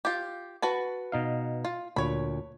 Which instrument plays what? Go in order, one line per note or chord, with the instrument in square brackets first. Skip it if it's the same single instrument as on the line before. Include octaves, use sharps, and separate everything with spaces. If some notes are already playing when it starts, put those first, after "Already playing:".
[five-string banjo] F4 G4
F#4 B4 A5
[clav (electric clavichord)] B2 D#4 F5
[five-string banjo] F4
[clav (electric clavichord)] D2 A#2 [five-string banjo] C#5 B5